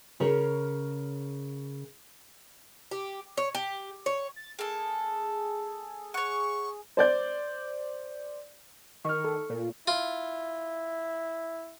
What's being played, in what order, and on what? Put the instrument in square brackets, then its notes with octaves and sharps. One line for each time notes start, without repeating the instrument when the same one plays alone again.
[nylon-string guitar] C#3 A#4 C#5
[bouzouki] G4
C#5
G4
C#5
[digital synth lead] A6
[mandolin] A#3 A4 [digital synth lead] G#4
[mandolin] C#5 F#5 [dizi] C#6
[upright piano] C5 D5 G6
[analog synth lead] D#3 [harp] C#6 F6
[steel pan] A4
[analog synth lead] A#2
[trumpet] E4 [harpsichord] F4